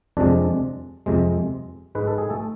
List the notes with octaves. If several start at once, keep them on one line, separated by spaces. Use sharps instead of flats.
F2 C3 G#3 D4 D5
F2 C3 G#3
G#2 G#3 B4
A4
G#4
A3 A4